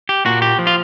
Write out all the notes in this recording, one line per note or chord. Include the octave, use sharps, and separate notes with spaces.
G4
A#2 F#4
G4
F3
F4